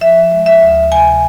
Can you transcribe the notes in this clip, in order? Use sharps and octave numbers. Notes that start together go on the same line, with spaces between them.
F3 E5
G#3
E5
D2
C3 G#5